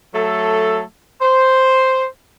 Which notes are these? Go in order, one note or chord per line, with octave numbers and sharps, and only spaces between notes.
F#3 A3 A4
C5